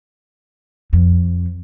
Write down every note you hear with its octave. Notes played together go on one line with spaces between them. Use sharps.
F2